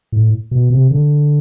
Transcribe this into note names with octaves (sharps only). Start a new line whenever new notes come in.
A2
B2
C3
D3